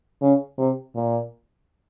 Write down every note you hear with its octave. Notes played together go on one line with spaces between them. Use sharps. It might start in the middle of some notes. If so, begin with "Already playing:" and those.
C#3
C3
A#2